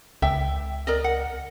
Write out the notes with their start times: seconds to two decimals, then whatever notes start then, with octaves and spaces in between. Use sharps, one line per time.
0.22 C#2 E5 G5
0.87 A#4 D5 D#5
1.04 F#5